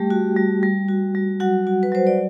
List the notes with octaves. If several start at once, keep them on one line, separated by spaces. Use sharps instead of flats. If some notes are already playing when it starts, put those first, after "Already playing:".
Already playing: G3 A3 G4 G5
F#4
G3
G3
F#4
G3
F#3 F#4 F#5
F#4
B4
F#3 C5
D5